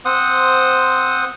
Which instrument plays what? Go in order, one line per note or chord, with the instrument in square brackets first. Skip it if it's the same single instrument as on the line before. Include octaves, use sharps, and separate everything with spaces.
[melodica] C4 C5 F#5 D#6